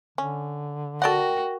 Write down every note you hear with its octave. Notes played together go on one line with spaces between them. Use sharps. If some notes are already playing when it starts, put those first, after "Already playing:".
D3 C#4
F#4 A4 A#4 D5 F#5 G5